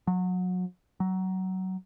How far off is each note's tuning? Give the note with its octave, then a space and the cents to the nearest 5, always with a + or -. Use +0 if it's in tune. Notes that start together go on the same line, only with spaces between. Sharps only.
F#3 -25
F#3 +20